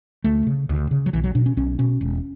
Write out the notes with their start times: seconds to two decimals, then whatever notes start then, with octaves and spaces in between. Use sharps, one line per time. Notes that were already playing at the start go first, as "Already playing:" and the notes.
0.24 D2 A3
0.47 C#3
0.69 D2
0.91 C#3
1.06 F#3
1.13 B1 E3
1.24 F#3
1.35 B2 D4
1.46 C#4
1.57 B1 C#4
1.79 B2 C#4
2.01 E1